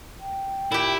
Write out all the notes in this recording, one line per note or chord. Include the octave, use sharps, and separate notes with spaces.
G5
A#2 E4 G4